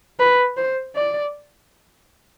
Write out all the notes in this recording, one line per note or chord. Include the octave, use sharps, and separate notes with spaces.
B4
C5
D5